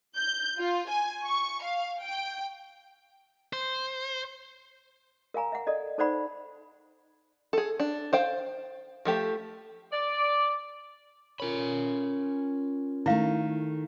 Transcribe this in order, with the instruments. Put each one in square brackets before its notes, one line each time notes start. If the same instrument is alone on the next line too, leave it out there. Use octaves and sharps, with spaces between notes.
[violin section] G6
F4
G#5
C#6
F5
G5
[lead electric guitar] C5
[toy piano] A#4 F5 G#5 A#5
E5 F#5
A4 D5 D#5
D#4 A4 C5 D5 F#5 B5
[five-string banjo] G#4 A4
D4
C5 F5 G5
F3 A3 G4
[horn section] D5
[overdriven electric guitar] C#4 B5 [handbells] F4 A#4 C#5
[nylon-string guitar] D#3 A3 [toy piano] E4 F5